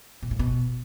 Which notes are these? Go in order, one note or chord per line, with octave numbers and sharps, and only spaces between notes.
B2
A2
B2